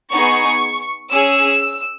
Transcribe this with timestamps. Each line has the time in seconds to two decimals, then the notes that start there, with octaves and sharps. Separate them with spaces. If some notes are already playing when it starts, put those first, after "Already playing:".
0.12 B3 D#4 G#4 C#6
1.12 C#4 G#4 E6